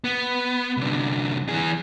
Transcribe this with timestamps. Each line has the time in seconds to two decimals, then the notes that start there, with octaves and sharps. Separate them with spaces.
0.04 B3
0.77 C2 D3
1.49 E3 G#4